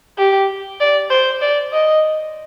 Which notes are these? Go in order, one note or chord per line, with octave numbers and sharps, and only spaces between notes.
G4
D5
C5
D5
D#5